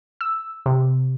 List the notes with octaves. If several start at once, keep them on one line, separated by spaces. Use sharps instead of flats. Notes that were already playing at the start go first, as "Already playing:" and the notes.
E6
C3